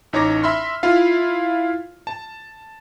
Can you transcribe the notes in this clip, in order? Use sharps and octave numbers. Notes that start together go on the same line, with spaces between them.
A1 D#4 C#5 A#5 D6 A#6
E5 B5 C6 F6
E4 F4 F5
A5